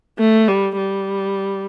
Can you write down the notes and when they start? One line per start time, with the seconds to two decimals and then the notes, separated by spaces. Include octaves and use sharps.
0.19 A3
0.48 G3
0.77 G3